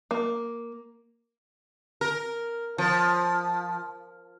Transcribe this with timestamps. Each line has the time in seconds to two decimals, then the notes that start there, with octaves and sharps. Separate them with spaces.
0.11 A#3
2.01 A#4
2.78 F3